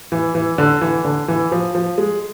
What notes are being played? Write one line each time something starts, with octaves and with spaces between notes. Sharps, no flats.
E3
E3
D3
E3
D3
E3
F3
F3
G#3